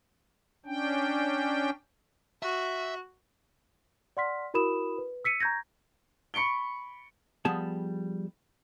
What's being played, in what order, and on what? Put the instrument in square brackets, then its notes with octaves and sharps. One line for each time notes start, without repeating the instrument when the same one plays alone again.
[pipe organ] C#4 D4 G5
[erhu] F#4 [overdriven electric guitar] E5
[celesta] D5 F#5 C6 F6 B6
E4 F#4 A#4 B5 D#6 E7
B4
E6 B6 C#7 D#7
A#5 C#6 G6 G#6 A#6
[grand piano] B5 C#6 C#7 D7 G7
[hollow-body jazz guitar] F3 G3 B3 G#4 A5